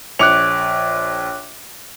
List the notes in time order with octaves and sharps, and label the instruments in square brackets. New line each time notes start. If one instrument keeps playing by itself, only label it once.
[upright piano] A#1 C#7 F7 [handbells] C#5 D6 F#6